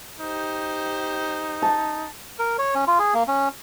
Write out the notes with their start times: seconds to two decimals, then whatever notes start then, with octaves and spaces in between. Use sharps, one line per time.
0.20 D#4 G4 C5
1.62 A5
2.39 A#4
2.58 C#5
2.75 C#4
2.87 F4
2.99 G#4
3.14 A#3
3.28 C#4